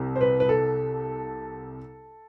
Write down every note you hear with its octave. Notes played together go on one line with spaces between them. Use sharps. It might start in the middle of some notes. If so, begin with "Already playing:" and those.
Already playing: C2 C3
C5
B4
B4
A4